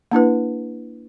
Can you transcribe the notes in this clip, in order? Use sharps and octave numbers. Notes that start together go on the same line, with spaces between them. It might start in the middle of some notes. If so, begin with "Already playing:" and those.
A#3 D4 E4 B4